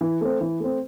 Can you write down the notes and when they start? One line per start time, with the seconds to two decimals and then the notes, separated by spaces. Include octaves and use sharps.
0.01 E3
0.21 A3 C4
0.41 E3
0.60 A3 C4